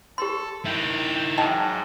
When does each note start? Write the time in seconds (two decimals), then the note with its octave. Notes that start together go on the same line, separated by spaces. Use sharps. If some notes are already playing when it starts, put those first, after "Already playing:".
0.18 G4 A4 C6
0.66 D#3 E4 G5
1.38 G#2 F#3 D#5 G5 A5